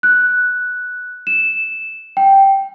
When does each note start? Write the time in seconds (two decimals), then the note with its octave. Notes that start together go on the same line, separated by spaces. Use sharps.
0.03 F#6
1.27 E7
2.17 G5